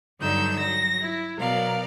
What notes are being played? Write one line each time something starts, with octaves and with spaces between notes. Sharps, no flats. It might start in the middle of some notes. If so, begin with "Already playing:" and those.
G2 D3 F#3 D#4 E6 G6
F#3 A#6
E4
B2 F#3 A#4 D5 F5